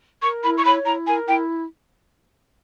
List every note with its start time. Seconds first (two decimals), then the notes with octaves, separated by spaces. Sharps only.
0.22 A#4 C#6
0.43 E4 B5
0.58 C#6
0.65 C#5 B5
0.86 E4 A#5
1.06 A#4 G#5
1.28 E4 G5